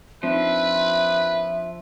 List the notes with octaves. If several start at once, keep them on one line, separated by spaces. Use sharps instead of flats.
F3 C4 D4 D#4 B4 E5